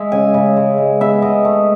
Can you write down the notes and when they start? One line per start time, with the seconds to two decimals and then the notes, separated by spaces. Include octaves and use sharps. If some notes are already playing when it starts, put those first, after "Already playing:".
Already playing: G#3 E5
0.12 C#3 G#5
0.34 C#3
0.57 G#3
0.78 G#3
1.00 B3 E5
1.22 G#3 D#5
1.45 A3